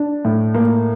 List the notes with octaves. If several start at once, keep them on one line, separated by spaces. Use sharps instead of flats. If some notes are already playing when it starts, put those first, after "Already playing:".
Already playing: D4
A2
A#3